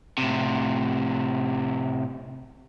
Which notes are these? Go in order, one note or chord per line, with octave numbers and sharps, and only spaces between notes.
A2 C3